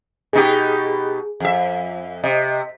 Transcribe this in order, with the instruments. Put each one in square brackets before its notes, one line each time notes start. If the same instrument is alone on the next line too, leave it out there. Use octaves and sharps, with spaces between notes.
[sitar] B2 D#4 G4 [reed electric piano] G#4
[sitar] F2 E5
[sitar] C3 [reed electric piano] D#5